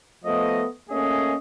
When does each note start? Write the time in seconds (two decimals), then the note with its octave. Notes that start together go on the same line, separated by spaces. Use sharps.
0.25 F3 A3 B3 D#5
0.90 A3 A#3 C#4 G#4 D#5